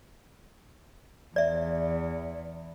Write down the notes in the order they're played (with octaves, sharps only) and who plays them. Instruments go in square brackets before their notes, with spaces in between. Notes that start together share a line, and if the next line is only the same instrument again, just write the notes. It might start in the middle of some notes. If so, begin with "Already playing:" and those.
[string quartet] E2 [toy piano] D5 E5